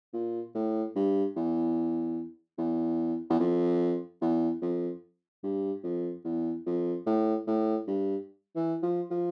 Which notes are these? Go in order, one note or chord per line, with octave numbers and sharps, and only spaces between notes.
A#2
A2
G2
E2
E2
E2
F2
E2
F2
G2
F2
E2
F2
A2
A2
G2
E3
F3
F3